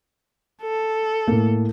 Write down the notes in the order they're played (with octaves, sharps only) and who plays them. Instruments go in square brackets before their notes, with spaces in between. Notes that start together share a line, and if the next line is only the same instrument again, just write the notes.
[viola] A4
[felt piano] A2 A#3